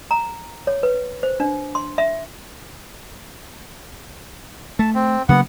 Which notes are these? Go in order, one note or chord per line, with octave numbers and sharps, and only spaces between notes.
A#5
C#5
B4
C5
D4
C6
E5
A3 A5
C4
C#3 F#3 A#3 B3 F#5